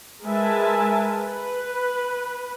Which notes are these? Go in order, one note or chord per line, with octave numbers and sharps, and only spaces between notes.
G#3 A#4 B4 E5 G#5 A5
B4